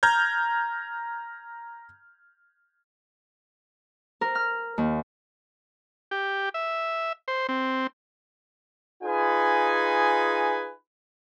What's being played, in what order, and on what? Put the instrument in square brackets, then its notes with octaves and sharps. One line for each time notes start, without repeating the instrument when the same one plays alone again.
[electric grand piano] A#5 F6 G6 G#6
[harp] A#4
F6
D#2
[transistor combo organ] G4
E5
C5
C4
[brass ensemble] D#4 F4 G#4 B4 G#5